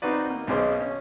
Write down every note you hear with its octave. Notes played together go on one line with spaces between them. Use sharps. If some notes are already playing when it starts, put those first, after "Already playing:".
C4 D#4 F#4 B4 D5
A#3
B1 B2 C#4 G#4 C5 D6
C#4